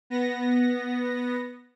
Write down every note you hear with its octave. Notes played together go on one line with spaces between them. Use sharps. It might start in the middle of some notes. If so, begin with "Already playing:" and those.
B3 A#6